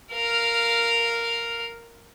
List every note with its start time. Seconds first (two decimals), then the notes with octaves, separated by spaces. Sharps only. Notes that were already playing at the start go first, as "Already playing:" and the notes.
0.13 A#4 F5